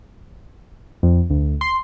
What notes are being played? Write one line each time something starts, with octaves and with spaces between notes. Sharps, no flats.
F2
D2
C6